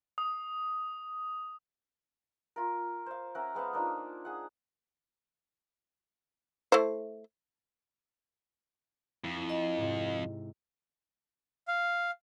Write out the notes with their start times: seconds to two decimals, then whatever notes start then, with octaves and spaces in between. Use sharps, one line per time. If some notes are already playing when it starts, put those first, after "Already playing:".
0.18 D#6
2.56 F4 A#4
3.06 C5 F5
3.35 C#4 A#4 E5 F#5
3.55 G#3 B3 C5 F5
3.73 A#3 D4 D#4 F4
4.25 G#4 F#5
6.72 A3 E4 C5
9.24 F2 E4
9.49 D#5
9.78 G#2 C3
11.68 F5